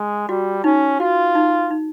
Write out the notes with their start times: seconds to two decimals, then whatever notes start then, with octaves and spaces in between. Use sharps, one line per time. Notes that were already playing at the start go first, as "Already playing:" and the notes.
Already playing: G#3
0.28 G3 F#4
0.64 C#4 D#4
1.00 F4 F#4
1.35 D#4
1.70 D#4